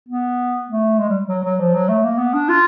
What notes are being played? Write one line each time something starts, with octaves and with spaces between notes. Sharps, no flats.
B3
A3
G#3
G3
F#3
F#3
F3
F#3
A3
A#3
B3
D4
F4